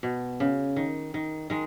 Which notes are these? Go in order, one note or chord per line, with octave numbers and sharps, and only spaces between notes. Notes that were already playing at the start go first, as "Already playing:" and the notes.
B2
C#3
D#3
D#3
D#3 G#3